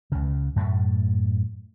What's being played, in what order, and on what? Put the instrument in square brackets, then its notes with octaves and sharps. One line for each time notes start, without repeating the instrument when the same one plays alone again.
[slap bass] C#2 C#3
F#2 A2 A3